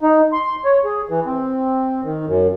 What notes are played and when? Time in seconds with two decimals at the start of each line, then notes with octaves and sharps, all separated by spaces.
0.01 D#4
0.33 C6
0.65 C#5
0.84 G#4
1.09 E3
1.26 C4
2.04 D#3
2.26 F#2